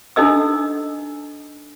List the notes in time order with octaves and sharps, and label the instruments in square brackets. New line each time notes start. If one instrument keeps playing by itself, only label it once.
[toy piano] D4 D#4 A4 D#5 E6